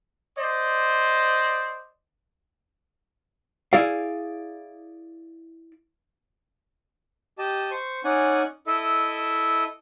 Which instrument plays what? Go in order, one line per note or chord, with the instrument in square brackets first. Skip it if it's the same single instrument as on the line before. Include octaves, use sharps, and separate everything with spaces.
[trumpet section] C5 D5 D#5
[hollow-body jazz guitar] E4 G#4 D5 F5
[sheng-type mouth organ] G4 D#5 A5
C5 C#6
C#4 D#4 D5 F#5 G#5
E4 A4 D#5 E5